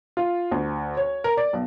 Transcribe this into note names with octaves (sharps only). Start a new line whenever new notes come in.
F4
D2
C#5
A#4
D5
B1